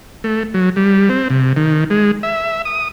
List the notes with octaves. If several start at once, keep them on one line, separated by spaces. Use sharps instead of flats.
A3
F#3
G3
C4
C3
D#3
G#3
E5
D#6